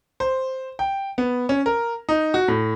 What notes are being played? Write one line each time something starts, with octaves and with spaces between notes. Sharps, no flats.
C5
G5
B3
C#4
A#4
D#4
F#4
A2